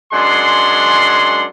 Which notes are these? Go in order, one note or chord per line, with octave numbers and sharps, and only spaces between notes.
F#2 G#3 D4 F#5 C6